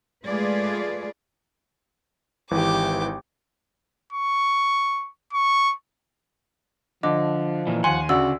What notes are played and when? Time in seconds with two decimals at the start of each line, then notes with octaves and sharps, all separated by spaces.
0.25 G#3 A3 F4 G#4 B4 D5
2.51 G#1 E3 G4 D6
4.12 C#6
5.33 C#6
7.03 D3 F3 D#5 D6
7.67 A#2 E3
7.84 D#2 F#5 G#5 C6
8.09 D2 C#3 F#4 D5 E6